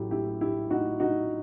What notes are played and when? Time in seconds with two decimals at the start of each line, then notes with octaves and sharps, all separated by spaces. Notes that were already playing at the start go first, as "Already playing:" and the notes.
Already playing: A1 A2 F#3 A3 E4 G4
0.11 E4 G4
0.41 E4 G4
0.70 D#4 F#4
1.00 D#4 F#4